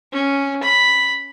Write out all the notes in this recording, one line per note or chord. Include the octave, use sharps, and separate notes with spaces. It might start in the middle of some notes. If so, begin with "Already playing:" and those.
C#4
B5